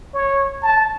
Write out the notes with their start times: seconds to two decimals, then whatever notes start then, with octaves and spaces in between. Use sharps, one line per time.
0.14 C#5
0.63 A5